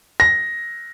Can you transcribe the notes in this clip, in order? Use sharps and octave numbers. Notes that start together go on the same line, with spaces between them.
A#6